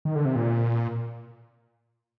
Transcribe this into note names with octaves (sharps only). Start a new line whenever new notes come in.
D#3
D3
C3
A#2